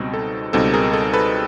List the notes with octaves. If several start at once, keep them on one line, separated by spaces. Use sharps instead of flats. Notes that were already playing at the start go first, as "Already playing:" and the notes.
Already playing: C#2 B2 G3 C4 D#4
A4
C#2 B2 G3 C4 D#4 A4
G#4 A#4
A4
A4 B4